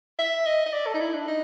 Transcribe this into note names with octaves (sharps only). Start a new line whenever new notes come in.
E5
D#5
D#5
D5
A4
D#4
E4
D4
D#4